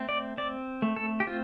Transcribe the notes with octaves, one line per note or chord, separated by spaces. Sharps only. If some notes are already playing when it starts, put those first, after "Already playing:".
Already playing: A3 C4
D5
C4 D5
A3
A4
G4
C4 F4